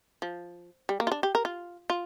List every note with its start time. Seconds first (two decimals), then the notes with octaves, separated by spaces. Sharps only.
0.22 F3
0.89 G3
1.00 A#3
1.07 F4
1.12 D4
1.23 G4
1.35 A#4
1.45 F4
1.90 F4